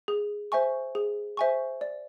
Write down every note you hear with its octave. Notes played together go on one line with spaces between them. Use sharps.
G#4
C5 E5 G#5 C#6
G#4
C5 E5 G#5 C#6
D5